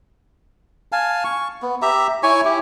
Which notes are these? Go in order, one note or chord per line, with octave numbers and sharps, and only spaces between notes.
F5 G#5 A5
C#6
B3
G4 E5 A#5
E4 C#5 G#5 C#6
E4 G4